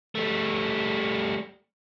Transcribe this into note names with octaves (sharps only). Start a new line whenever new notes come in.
G3 A3